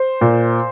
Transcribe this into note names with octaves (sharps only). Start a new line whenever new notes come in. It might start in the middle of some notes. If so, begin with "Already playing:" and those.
Already playing: C5
A#2